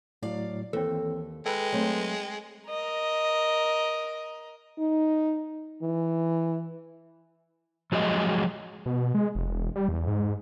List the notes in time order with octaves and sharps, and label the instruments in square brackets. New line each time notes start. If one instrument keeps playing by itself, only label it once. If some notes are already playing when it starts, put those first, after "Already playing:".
[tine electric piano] A2 F#3 [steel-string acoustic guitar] D5 F5
[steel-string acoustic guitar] D#2 [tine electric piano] E3 C4 [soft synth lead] A4
[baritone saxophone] G#3 [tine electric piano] A4 B4 [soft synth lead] G5
[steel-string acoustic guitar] F#3 A3 C4
[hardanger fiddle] A#4 D#5
[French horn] D#4
E3
[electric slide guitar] F3 F#3 G#3 D#5
[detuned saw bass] B2
G#3
F1
E1
G3
E2
G#2